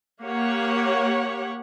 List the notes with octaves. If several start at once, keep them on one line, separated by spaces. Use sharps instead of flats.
A#3 G4 C#5 F#5